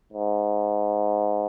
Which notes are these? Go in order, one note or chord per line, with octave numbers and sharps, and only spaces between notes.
G#2